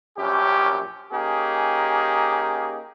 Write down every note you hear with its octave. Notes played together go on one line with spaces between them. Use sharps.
A#1 F#2 C#4 G4
A#3 C#4 D#4 G4 G#4